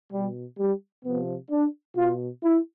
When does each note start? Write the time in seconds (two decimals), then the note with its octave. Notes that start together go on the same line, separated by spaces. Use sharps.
0.13 B2 G3
0.59 G3
1.05 C3 F3 B3
1.51 D4
1.97 B2 F4
2.44 E4